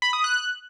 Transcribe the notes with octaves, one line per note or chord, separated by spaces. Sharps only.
B5
D#6
F#6